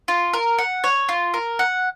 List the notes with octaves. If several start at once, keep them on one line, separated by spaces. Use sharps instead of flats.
F4
A#4
F#5
C#5
F4
A#4
F#5